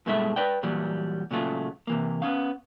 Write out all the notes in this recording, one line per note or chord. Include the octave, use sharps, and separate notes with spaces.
G2 B2 G#3 A3 E4 E5
B4 D5 G5
A#2 E3 F#3 G3
A#2 C#3 F#3 A3 F4
C3 E3 A#3
B3 C#4 F5